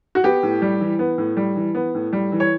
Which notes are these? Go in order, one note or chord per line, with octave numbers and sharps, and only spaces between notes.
F#4
B3 G4
A2
G3
E3
B3
A2
G3
E3
B3
A2
G3
E3
C#5